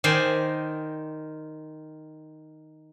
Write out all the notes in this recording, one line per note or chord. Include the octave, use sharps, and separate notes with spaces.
D#3 C5 D5 G#5